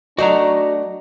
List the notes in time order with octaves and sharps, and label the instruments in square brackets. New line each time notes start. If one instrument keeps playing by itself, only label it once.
[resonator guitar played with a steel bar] F#3 A3 D5 [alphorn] D4 [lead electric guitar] F#4 A#5 [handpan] D#5